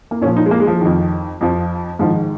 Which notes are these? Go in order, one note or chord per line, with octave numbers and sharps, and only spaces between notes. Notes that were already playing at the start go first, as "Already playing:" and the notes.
A#3
A#2 F3 C#4
D#4
G#3
A#3
G#3
F3
F2 D#3
F2 F3
G#2 D#3 F3